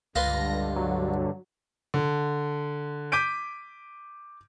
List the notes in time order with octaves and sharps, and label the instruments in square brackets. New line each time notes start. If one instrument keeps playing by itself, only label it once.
[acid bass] C#2 [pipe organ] G2 D3 [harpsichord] F4 B4 [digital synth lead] A#6
[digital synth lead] F#3
[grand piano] D3
D6 G6 B6 D7 D#7